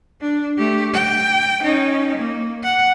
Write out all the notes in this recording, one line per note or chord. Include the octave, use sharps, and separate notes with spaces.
D4
A3 G4
G5
C#4 D#4
A#3
F#5